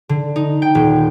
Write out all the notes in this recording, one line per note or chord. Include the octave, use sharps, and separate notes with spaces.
D3
D#4
G5
D#1